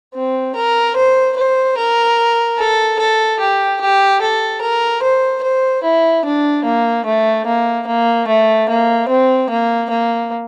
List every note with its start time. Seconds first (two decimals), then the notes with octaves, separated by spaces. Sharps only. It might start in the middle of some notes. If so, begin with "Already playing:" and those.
0.15 C4
0.55 A#4
0.96 C5
1.36 C5
1.77 A#4
2.58 A4
2.99 A4
3.40 G4
3.81 G4
4.21 A4
4.61 A#4
5.02 C5
5.43 C5
5.83 E4
6.25 D4
6.65 A#3
7.05 A3
7.46 A#3
7.87 A#3
8.28 A3
8.69 A#3
9.09 C4
9.50 A#3
9.90 A#3